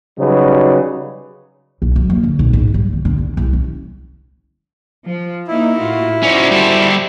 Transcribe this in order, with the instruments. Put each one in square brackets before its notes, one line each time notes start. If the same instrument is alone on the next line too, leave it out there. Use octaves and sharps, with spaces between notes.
[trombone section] C#3 F#3 G3 D#4 B4
[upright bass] B1
F#2
A#3
D3
B1
G#2
G3
D#3
D3
F1
C2
C#4
[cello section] F3
[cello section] A#3 D#4 [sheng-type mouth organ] E4
[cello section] A2 F4 F#4
[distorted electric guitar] C#4 D#4 [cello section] F#4 C5 D5
[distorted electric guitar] G3 A4